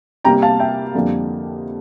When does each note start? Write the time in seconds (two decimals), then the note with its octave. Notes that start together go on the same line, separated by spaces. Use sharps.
0.24 C3 G3 A#3 G5 A#5
0.42 F5 A5
0.60 E5 G5
0.95 F2 D3 G3 A#3